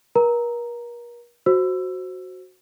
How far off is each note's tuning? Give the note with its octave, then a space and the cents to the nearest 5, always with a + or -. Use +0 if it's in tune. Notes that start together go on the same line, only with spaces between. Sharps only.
A#4 +40 A#5 +0
F#4 +0 C5 +5 E6 +15